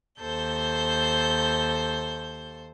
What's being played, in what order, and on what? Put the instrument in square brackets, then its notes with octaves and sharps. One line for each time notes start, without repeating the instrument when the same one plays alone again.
[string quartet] D#2 A4 C5 G6